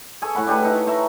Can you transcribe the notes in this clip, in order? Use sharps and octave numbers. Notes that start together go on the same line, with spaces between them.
G#4 A4 G#5 C#6
A2 F#5 B5
D4 G4 G#4 B4
D#4 A4
C#5
E5 A5 A#5 C#6